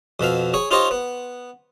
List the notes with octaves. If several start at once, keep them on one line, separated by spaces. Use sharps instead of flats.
F2 B2 E5 F5
G#4 C#5 G#5
D#4 F4 G4 C5 C#5 D#5
B3